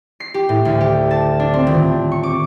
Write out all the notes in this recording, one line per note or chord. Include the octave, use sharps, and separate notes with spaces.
C7
G4
A2
D2
G4
A5
D4
C4
D#1
C#6
D6